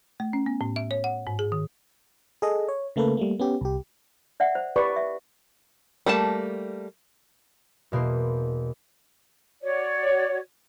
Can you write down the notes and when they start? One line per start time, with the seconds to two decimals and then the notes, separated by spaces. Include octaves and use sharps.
0.20 A3
0.33 C#4
0.46 B3
0.61 A2
0.76 E5
0.91 C#5
1.04 F#5
1.27 G#2
1.39 G#4
1.52 D#3
2.42 G#4 A4 D#5
2.68 C#5
2.96 C#3 A3 A#3 A4 B4
3.17 G3 A3 A#3
3.39 B3 C#4 G4
3.61 C2 G4
4.40 D5 E5 F#5
4.55 C5
4.76 G4 B4 D5 C#6
4.96 E5
6.06 G3 A3 A#3 A5
7.92 E2 B2 A#3 C5
9.62 F#4 C#5 D5